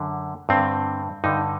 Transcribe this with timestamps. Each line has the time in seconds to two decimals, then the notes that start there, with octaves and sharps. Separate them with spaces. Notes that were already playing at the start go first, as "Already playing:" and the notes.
Already playing: F#2 D3
0.49 G2 D3 C4
1.24 G2 D3 D#4